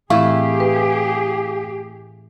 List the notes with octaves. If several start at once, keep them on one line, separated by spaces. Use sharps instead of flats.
A2 E3 A3 C4 E4 G4 G#4 F5
B4